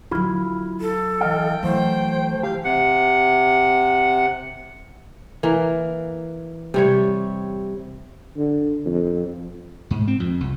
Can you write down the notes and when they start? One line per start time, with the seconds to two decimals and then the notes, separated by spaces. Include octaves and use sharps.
0.11 D3 F#3 E4 F4 B5
0.81 A4
1.21 E3 D#5 F5 G5
1.63 E3 F#3 A3 C5
2.43 E3 G4 F5
2.64 C3 F#5
5.43 E3 A#3
6.74 C3 G3 C#5
8.37 D3
8.86 F2
9.91 G#2
10.07 C4
10.20 F2
10.40 C2